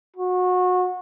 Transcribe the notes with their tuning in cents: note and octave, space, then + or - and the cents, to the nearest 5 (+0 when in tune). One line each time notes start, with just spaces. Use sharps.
F#4 -25